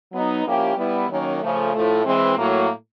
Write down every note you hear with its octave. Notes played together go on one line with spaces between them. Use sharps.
F#3 B3 D#4
F3 A#3 C#4 E4 G4
G3 B3 E4
D#3 F#3 A#3 C#4
C#3 F3 A3
A2 F3 A3
E3 G#3 C4
A2 F#3 A#3